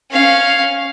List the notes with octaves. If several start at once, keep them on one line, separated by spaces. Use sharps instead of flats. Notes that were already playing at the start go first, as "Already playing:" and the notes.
C#4 F5